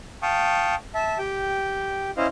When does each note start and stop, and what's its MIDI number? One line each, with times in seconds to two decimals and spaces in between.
0.22 0.75 77
0.22 0.75 79
0.22 0.75 81
0.22 0.75 85
0.22 0.75 87
0.95 1.18 76
0.95 1.18 81
1.18 2.10 67
1.18 2.10 79
2.17 2.27 61
2.17 2.27 64
2.17 2.27 72
2.17 2.27 75
2.17 2.27 77